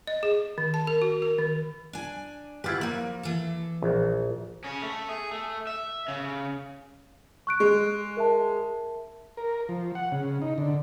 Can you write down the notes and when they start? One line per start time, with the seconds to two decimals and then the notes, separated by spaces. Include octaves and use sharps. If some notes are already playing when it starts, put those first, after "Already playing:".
0.07 D#5
0.23 G#4
0.58 D#3
0.74 A5
0.87 A#4
1.02 F#4
1.22 A#4
1.38 D#3
1.93 D4 G#5
2.64 D3 E4 F4 G4 B4
2.81 F3 A#3 A#4
3.23 E3 A4
3.82 A#1
4.64 C#3 C#4
4.82 A3
5.09 G#4
5.31 A3
5.67 E5
6.08 C#3
7.47 C#6 F#6 D7
7.60 G#3
8.17 A#4 E5 A5
9.37 A#4
9.69 F3
9.95 F#5
10.12 C#3
10.42 D#4
10.58 D3